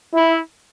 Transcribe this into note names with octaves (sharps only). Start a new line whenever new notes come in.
E4